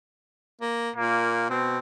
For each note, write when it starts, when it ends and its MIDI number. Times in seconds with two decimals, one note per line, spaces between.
0.61 0.90 58
0.96 1.49 46
0.96 1.48 58
1.50 1.78 47
1.50 1.79 60